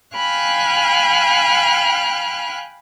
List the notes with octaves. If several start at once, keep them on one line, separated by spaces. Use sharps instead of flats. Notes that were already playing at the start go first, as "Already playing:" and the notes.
F5 G5 G#5 B5 F6 F#6